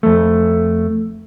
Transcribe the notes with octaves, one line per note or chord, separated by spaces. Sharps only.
F2 A3